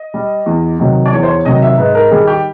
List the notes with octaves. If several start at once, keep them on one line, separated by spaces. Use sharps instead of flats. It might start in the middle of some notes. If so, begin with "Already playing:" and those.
Already playing: D#5
G3
E2
C3 D#3 F#3
D5
E2 C#5
C5
C#5
C3 D#3 F#3 D#5
E5
G#2 B4
A#4
D#3 G3 G#4
G4